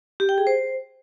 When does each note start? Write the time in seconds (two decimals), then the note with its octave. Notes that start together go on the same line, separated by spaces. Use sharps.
0.20 G4
0.29 G5
0.38 G#4
0.47 C5